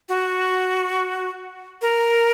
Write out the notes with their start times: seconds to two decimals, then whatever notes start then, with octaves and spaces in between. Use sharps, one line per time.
0.09 F#4
1.82 A#4